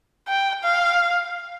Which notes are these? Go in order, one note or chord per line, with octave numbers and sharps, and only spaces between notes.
G5
F5